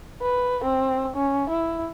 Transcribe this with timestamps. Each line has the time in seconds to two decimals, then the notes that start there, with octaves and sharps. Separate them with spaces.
0.22 B4
0.64 C4
1.16 C#4
1.49 E4